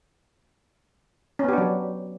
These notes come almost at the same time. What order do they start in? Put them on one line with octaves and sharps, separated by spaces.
C#4 B3 G4 D4 F#3